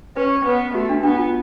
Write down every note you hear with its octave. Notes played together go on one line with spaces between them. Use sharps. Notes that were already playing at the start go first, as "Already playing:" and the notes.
C#4 B4
B3 B4
A3 F#4
D4
B3 D4
F4